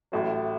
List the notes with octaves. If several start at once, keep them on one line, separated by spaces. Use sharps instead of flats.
A1 A2 F#3